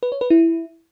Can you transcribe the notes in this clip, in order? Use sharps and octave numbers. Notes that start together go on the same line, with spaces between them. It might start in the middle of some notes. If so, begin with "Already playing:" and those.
B4
C#5
B4
E4